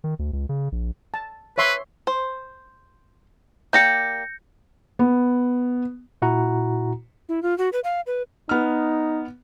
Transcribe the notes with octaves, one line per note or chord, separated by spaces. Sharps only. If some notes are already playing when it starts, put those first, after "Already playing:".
D#3
D2
C#2
C#3
A#1
A5
B4 C#5 E5 C6
C5
A#3 G4 D5 G6 A#6 C#7
B3
A#2 E4 F#4 F#5 A#5
E4
F4
F#4
B4
F5
B4
B3 D#4 F6